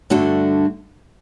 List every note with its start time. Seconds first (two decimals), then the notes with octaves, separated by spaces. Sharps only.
0.10 G2 D3 A3 D4 F#4